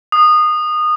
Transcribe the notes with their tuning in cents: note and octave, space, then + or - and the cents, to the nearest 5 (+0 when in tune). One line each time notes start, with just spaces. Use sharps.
D#6 -20